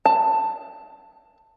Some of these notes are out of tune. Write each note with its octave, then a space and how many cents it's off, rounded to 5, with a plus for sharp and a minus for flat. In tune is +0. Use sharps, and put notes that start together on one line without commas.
A5 +15